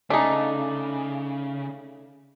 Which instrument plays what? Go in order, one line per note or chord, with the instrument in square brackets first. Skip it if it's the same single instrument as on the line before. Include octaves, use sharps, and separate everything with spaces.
[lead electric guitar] C#3 [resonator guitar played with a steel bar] A3 D#4 [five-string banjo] D4 G#4